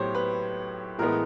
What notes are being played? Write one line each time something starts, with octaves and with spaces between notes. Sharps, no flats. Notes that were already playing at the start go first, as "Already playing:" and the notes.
Already playing: A2 F#3 B3 G4 C5 C#5
B4
A2 E3 G#3 B3 A#4